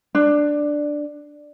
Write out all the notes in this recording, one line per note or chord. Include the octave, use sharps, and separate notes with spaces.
D4